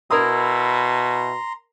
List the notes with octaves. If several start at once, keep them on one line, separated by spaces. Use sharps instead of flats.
B2 E4 A#4 A#5 C6 D#6